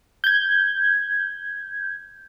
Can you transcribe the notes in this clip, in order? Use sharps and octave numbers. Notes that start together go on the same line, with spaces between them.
G6 G#6